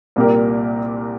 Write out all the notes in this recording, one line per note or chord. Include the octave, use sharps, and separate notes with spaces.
C2 A#2 A#3 G4 A#4